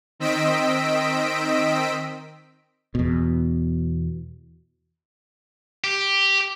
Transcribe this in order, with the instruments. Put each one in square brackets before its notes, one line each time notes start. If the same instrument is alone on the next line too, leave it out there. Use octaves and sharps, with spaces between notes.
[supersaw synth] D#3 C4 D#5 E6 B6 D7
[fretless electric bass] E2 B2
[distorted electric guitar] G4